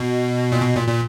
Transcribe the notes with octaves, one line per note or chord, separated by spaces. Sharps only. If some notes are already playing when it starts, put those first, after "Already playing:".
Already playing: B2
A#2
B2
A#2
A#2